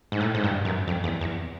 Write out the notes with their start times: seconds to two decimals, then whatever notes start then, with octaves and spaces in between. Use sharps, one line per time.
0.12 G#2
0.20 A2
0.35 G#2
0.44 G2
0.65 F#2
0.88 F2
1.04 E2
1.21 E2